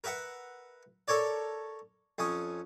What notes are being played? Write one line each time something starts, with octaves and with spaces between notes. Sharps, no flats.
A#4 B4 E5 F#5
A4 A#4 C#5 D5
F2 C#4 D#6